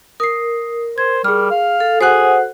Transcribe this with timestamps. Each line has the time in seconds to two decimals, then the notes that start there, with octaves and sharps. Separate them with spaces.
0.20 A#4 D#6 C7
0.98 C5 G#6
1.24 G3 G#4 F6
1.51 F5
1.80 A4
2.01 F#4 G#4 A4 C5 F#5 F#6